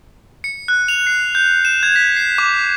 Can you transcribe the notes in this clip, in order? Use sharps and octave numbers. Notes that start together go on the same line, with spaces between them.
C#7
F#6
F7
C7
G6
E7
G#6
B6
C7
D6